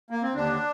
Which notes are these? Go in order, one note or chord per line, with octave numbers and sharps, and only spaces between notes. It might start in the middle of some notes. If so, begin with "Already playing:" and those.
A#3
C4
D#2 D3 D4